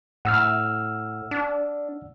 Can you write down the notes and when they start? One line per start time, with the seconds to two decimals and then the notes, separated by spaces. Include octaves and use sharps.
0.25 A2 F#5 E6 F6
1.31 D4